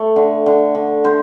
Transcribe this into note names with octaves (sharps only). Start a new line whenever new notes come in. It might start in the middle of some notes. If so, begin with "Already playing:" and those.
Already playing: A3
D3
D3
D3
D3 C5